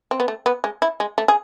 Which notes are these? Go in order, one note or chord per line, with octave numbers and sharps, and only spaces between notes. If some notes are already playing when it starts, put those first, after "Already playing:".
C4
B3
A3
B3
G#3
E4
G#3
A3
G#4